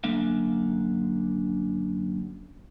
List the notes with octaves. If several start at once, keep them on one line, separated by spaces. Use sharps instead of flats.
F#2 D3 A#3 D4 E5 F5